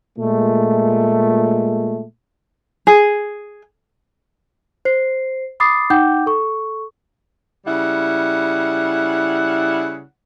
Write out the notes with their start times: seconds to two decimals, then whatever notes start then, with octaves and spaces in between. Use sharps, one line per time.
0.18 A#2 G#3 A3
2.87 G#4
4.85 C5 C7
5.60 B5 D6 D#6 A6 C7
5.90 D#4 F#5 G5 D6 G6
6.26 A4 C#6
7.66 C#3 G3 E4 F#5